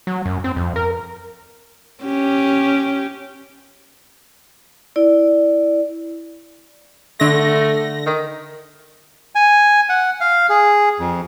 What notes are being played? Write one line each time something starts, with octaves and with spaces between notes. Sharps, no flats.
F#3
F#2
C4
F2
A#4
C#4 G4
E4 D5
D3 A3 A#6
D#3
G#5
F#5
F5
G#4
F2